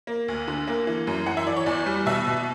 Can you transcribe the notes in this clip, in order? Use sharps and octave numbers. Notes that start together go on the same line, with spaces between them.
A#3
D2
D3
A#3
E3
F#2
E3 F#5
E5
E3 D5
C#5
E2 D5
G3
B2 E5
B2